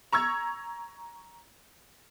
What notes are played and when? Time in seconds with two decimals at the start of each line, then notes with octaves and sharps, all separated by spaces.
0.12 A#5 C#6 E6 G#6